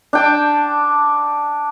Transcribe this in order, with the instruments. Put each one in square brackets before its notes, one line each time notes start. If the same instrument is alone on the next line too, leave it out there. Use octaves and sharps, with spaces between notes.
[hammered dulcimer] D4 G5 A5